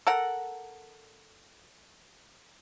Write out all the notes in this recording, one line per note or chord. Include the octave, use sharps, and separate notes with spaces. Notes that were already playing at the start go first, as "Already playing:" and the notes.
A4 A#4 F#5